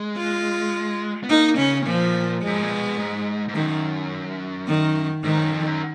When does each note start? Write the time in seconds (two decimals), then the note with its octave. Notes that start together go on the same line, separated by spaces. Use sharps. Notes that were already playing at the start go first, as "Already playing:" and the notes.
Already playing: G#3
0.17 F4
1.23 B3
1.29 A#3 D#4
1.58 C#3 C#4
1.86 A#2 F3
2.42 F#2 G#3
2.54 G#2
2.63 A#2
2.70 B2
2.98 G#2
3.48 G#2
3.55 F#2 D#3
4.68 D#3
5.24 G#2 D#3
5.38 F#2
5.52 F2
5.66 F#2